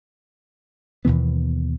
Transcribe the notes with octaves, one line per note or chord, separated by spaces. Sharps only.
D#2 B2 E3 B3